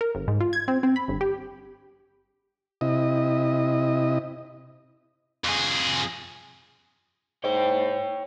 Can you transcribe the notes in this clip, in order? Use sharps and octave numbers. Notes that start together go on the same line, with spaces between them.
A#4
G1
G#2
F4
G#6
C4
C4
B5
G1
G4
C3 E4 D#5
F2 G#4
G#2 C#5 G5